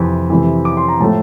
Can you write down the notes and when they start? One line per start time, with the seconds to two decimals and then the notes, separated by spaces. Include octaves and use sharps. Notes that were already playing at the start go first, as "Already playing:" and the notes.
Already playing: F2 C3 E3
0.30 F2 C3 E3
0.65 D6
0.77 C6
0.89 A#5
1.00 A2 F3 A3 A5